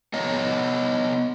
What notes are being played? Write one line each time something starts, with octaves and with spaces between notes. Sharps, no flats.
B3 C#5 D#5